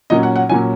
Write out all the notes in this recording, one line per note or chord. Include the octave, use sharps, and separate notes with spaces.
A#2 F#3 C#4 D#5
F#5
F#5
A#2 F#3 C#4 G#5